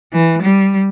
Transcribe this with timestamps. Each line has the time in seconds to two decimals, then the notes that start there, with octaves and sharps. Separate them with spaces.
0.13 E3
0.42 G3